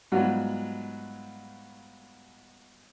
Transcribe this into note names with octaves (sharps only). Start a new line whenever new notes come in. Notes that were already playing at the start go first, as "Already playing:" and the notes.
G#2 F#3 G3 B3 F4 F#4